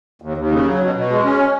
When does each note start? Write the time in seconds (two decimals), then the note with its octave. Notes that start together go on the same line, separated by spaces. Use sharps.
0.22 D#2
0.37 D#2
0.52 C#3
0.65 F#3
0.81 B2
0.95 B2
1.10 G#3
1.25 C#4